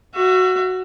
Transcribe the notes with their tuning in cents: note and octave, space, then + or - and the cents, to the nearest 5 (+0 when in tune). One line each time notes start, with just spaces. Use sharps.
F#4 +0 E5 +35